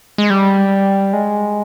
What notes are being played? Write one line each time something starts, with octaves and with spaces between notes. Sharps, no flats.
G#3
G3
G#3